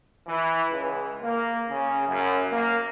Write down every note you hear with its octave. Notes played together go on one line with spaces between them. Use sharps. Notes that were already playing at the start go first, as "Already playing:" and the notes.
E3
C#2
A#3
C#3
F#2
A#3